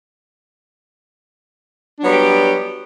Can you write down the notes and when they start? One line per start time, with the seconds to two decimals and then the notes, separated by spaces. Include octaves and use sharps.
1.98 D4
2.01 F#3
2.04 B3
2.07 G3
2.10 G4